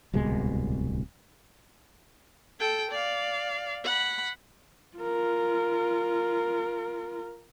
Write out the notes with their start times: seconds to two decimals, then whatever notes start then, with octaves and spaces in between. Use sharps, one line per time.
0.14 D1 C2 B2 G#3
2.60 A4 G5
2.91 D5 F5
3.84 F#5 B5
4.97 F4 A#4